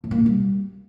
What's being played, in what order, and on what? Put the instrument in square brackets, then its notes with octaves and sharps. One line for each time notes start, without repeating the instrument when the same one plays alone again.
[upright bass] A2
A#3
B2
G3